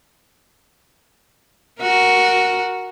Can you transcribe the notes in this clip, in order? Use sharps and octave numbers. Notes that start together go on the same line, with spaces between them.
F#4 A#4